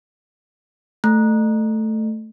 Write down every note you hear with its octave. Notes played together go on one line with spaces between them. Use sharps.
A3